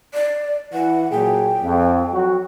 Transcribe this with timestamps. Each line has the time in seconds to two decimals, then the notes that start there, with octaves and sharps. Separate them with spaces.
0.14 D5
0.73 E3 F#5
1.12 A#2 F#3 G#4 G5
1.61 F2
2.14 F#3 F#4